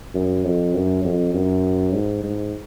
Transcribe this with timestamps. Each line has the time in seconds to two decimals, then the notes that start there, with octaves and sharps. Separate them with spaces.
0.14 F#2
0.45 F2
0.74 F#2
1.04 F2
1.34 F#2
1.93 G#2
2.23 G#2